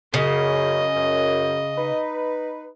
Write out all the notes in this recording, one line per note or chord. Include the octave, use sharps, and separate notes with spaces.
F#2 C#3 D#5
F#2
D#4 B4